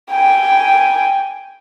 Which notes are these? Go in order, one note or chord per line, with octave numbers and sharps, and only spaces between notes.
G5 G#5